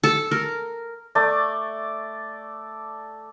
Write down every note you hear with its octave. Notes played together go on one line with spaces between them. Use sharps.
A4
A#4
A3 D5